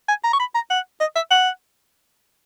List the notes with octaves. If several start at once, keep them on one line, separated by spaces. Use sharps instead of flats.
G#5
A#5
C#6
B5
A#5
F#5
D#5
E5
F#5